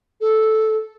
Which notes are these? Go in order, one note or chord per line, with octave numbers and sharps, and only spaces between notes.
A4